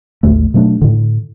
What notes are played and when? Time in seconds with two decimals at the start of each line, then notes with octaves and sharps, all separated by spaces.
0.23 A1 D#2 D3 A3
0.54 B2 F#3 A3 D4
0.82 A2 D3